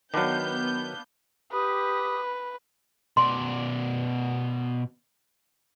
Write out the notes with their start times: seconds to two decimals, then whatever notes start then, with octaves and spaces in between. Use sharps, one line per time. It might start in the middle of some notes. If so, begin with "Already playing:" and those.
0.14 D#3 F#3 B3 D4 B4 F5 G6
1.52 G4 B4 D#6
3.17 B2 D5 C6